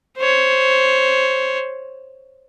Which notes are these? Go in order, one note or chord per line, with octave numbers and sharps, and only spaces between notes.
C5 C#5